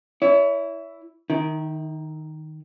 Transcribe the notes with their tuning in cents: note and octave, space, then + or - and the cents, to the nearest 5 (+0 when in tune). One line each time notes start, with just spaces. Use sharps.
E4 +0 C#5 +35
D#3 +0 E4 -40